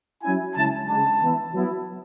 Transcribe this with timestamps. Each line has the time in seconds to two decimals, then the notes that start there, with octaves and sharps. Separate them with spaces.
0.23 F#3 C#4 E4 G#5
0.55 C#3 G#3 C#4 E4 A5
0.88 C#3 G#3 D4 A5
1.21 E3 B3 E4
1.54 F#3 B3 E4